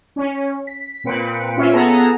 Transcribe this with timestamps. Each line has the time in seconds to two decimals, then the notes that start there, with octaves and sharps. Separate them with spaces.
0.16 C#4
0.67 B6
1.04 A#2 C4 B4 C#7 D7
1.57 C#4 F4 E5
1.73 B3 G#4 A4 A#5